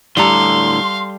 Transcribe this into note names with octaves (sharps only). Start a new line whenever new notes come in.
A2 D3 G3 G4 A4 F5 A#5 C6